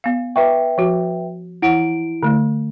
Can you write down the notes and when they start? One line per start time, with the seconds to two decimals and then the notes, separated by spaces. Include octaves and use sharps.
0.04 B3 F5
0.36 B4 E5 G5 C#6 D6
0.78 F3 F#4
1.62 E3 E4 F#5 D7
2.23 D3 A3